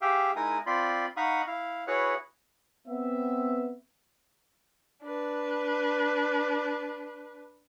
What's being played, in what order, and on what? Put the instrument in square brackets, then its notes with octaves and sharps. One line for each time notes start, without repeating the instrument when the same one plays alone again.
[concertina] G4 G#4 E5 F5 G5
G#3 D#4 E4 A#4 G#5 D#6
C4 F4 D5 B5 C6
D#4 F5 F#5 B5 C#6 D#6
E4 F5
E4 F#4 G#4 B4 C#5 F#5
[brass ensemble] B3 C4 E5
[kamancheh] D4 B4